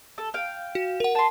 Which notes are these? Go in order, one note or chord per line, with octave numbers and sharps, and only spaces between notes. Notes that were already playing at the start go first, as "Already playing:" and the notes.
A4
F5 G5
F#4
A#4 F#5
A5 C6